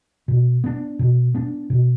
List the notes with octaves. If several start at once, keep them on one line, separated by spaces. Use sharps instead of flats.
B2
B3 D4
B2
B3 D4
B2